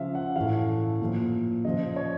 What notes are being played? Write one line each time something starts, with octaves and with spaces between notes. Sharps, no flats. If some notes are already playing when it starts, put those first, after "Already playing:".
Already playing: C#3 F3 E5 F5
F#5
A2 E3 F5
A#2 F3
C#3 F3 D#5
C#5